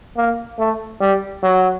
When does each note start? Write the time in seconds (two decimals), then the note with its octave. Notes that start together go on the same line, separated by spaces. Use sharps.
0.17 A#3
0.59 A3
1.01 G3
1.43 F#3